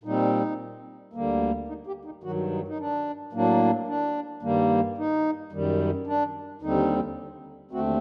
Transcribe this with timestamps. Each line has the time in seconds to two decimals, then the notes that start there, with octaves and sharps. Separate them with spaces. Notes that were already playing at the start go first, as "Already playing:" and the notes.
0.04 A#2 G3 C4 D#4
1.13 D2 D3 G3 A#3
1.68 D#4
1.87 G4
2.05 D#4
2.23 G2 D#3 F#3 F#4
2.51 D#4
2.68 D#4
2.79 D4
3.33 A2 F#3 A#3 D4
3.87 D4
4.43 G2 D#3 G3 A#3
4.98 D#4
5.52 F#2 D#3 G3
6.07 D4
6.62 D#2 D3 G3 C4 D#4
7.71 D#2 D3 A3 C4 F#4